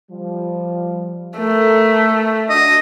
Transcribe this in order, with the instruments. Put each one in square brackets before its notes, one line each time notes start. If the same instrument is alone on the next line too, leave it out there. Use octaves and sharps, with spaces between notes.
[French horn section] F3 G3
[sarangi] A3 [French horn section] A4 A#4
[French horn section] D4 F#4 [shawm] D#5